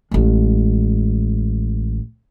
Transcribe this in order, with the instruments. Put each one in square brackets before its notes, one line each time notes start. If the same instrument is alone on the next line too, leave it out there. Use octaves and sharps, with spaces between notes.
[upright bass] A1 G#3